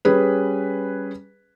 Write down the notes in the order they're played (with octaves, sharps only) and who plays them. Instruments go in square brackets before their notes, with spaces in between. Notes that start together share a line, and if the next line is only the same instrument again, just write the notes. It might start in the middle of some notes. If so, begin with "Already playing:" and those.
[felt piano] G3 C#4 G#4 B4